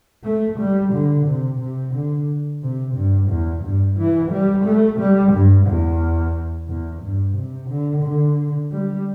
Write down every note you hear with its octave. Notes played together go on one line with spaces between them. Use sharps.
A3
G3
D3
C3
C3
D3
C3
G2
E2
G2
E3
G3
A3
G3
G2
E2
E2
G2
C3
D3
D3
G3